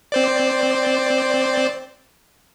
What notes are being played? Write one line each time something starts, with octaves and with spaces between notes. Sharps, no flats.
C4 C5 D5